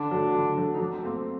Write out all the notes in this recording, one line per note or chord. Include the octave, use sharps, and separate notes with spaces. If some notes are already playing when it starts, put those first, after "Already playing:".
Already playing: D3 D4
F#3 A3
D3
F#3 A3
D#4
F#3 D4
C4
A3 A#3 C4